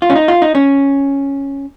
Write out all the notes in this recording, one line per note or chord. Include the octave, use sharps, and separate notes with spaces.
F4
C#4
D#4
F4
D#4
C#4